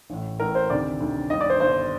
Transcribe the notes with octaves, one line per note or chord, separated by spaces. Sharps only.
A1 A2
A1 A2 A#4
C5
D2 C3 D#3 D5
D2 C3 D#3
G1 G2 D#3 D#5
D5
C5
G1 G2 D#3 C5